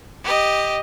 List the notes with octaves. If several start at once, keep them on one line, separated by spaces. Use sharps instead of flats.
G4 D#5